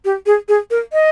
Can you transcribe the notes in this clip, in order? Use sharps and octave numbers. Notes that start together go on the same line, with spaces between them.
G4
G#4
G#4
A#4
D#5